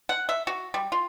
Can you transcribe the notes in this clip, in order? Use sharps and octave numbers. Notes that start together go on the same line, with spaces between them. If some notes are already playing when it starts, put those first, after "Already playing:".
F#5
E5
F#4
G3
F4